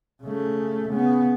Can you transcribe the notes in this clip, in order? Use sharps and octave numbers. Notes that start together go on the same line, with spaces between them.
C#3 A3
C#3 B3